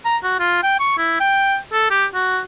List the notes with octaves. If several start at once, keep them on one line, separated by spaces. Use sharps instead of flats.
A#5
F#4
F4
G5
C#6
E4
G5
A4
G4
F#4